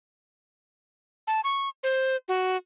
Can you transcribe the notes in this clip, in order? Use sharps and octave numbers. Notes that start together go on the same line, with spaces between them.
A5
C#6
C5
F#4